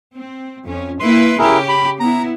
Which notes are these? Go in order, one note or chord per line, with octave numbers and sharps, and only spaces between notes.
C4
F2 C#4
A#3 E4 B4 C6
C#3 C#4 E4 G4 G#4 A#4
B5
B3 E4 A#5